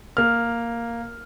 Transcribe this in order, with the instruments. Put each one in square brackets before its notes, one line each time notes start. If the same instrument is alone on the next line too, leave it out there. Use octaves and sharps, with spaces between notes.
[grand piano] A#3 F6